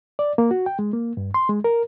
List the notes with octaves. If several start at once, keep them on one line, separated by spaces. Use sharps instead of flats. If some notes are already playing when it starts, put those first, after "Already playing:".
D5
A#3
F#4
G5
G#3
A#3
G2
C6
G#3
A#4